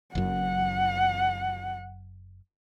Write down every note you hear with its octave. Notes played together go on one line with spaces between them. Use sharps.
F#1 F#2 F#5